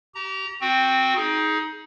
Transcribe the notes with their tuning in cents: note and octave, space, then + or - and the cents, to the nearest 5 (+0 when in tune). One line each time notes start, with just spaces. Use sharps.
G4 -35 A#5 -5
C4 +0 F#4 -10 G5 +0
D#4 +15 G#4 +15